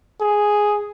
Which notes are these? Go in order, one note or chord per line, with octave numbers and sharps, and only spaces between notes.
G#4